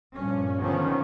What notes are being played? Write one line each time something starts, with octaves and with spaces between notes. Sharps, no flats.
A#1 G2 C#4
D3 D#3 F3 B3 C#4